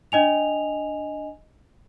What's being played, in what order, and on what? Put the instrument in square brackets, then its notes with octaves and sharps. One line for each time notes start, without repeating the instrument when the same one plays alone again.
[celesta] D4 D#5 G#5 F7